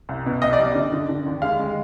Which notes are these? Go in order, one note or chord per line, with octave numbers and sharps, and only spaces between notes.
C2
B2
C2 D#5
D5
G3
D3
D3
D3
D#2
G#3 F5
G#3